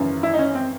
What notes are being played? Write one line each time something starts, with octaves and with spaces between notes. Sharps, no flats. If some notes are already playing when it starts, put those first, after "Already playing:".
Already playing: G#1 F#2 C#3 E3
E4
D#4
C#4
C4